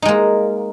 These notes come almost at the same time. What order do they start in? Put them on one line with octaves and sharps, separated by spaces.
D#4 G#3 A#3